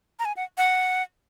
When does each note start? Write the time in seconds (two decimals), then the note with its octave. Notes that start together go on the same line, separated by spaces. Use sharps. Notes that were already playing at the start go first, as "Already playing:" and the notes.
0.19 A#5
0.25 G#5
0.37 F#5
0.58 F#5